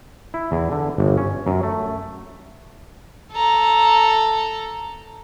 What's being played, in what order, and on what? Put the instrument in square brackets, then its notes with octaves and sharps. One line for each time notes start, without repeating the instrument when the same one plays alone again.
[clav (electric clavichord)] E4
E2
D3
G1
C#4
F#2
A3
[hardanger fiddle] A4 A#5